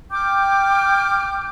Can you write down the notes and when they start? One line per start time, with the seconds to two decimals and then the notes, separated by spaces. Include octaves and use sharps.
0.11 G5 D6 F6 G6